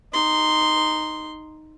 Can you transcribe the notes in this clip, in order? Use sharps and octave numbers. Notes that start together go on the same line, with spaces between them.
D#4 C6